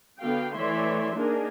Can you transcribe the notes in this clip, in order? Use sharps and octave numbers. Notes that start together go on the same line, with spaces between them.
D3 B3 F#4 F5 G5
E3 A3 C#5 D5 E5 C6
A#3 D4 D#4 G#4 A#4